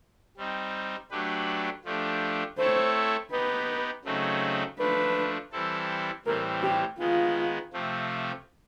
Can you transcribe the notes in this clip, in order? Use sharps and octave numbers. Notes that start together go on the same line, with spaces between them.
G3 C4 D#4
F#3 A3 D4 G4 B4
F3 A3 D4 G4
A3 C4 E4 A4 C5 C#5
B3 D#4 G4 B4
C#3 F#3 A3 C4 D#4
F3 A3 D4 B4
E3 G3 C4 E4 A4
A2 E3 G3 C4 A#4
G4
D#3 G#3 B3 F4
C3 F3 A3 C4